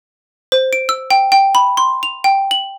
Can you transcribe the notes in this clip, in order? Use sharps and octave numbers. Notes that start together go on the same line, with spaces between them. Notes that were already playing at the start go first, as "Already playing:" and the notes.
C5
D7
E6
G5
G5
B5
C6
F7
G5
F#7